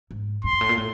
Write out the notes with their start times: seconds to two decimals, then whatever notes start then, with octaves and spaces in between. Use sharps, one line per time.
0.11 G#2
0.44 G2 C6
0.53 G#2
0.61 A2
0.69 A#2
0.78 A2